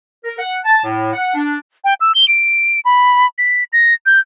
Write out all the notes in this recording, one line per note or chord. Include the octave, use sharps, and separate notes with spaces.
A#4
F#5
A5
A2
F#5
D4
G5
E6
G7
D7
B5
B6
A#6
G6